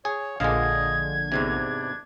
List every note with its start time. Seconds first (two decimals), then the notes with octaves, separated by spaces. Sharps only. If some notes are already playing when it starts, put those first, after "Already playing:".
0.05 G#4 C#5
0.40 A#1 D3 G#3 D#5 F5 G#6
1.32 E2 G#2 C3 D4